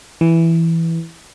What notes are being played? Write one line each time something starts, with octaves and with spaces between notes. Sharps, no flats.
E3